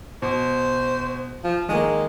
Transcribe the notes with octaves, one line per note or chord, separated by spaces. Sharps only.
B2 C5
F3
D#3 G#3 A#3